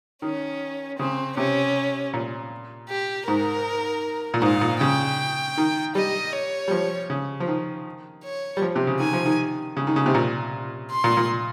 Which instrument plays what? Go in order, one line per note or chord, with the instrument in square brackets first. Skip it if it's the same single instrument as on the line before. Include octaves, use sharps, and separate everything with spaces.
[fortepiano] D#3 [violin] C#4
[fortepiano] C#3 [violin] C4
[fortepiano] C3 [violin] C#4
[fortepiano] A#2
[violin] G4
[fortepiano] G#2 [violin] A#4
[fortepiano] A#2
[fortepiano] G#2 [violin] F5
[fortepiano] A#2
[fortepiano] C#3 [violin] G5
[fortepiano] D#3
[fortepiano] G3 [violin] D#5
[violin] C#5
[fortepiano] G3
F3
C#3
F3
D#3
[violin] C#5
[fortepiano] G3
F3
C3
C#3
[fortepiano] D#3 [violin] G#5
[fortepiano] F3
D#3
C#3
D#3
C#3
C3
A#2
[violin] C6
[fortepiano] A#2
A#2